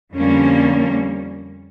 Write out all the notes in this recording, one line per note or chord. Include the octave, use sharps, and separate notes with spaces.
F2 D3 G3 A#3 C#4